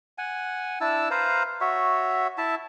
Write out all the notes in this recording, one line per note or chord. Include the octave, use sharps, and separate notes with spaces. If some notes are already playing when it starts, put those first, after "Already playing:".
F#5 G#5
D4 E4 A5 E6
B4 C5 F5 A#5
F#4 C#5 E5
E4 E5 A5